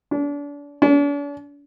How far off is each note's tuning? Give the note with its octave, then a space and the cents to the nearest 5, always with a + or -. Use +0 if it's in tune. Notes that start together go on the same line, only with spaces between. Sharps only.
D4 -35
D4 -45